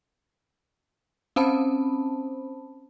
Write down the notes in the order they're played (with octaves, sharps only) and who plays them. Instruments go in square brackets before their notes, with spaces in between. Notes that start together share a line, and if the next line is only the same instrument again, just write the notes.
[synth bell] C4 C#4 C5 A5 B5